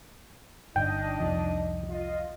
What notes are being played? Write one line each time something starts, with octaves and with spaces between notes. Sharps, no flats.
G1 D4 D#4 D#5 G5
C2 F2 F3
F4 D#5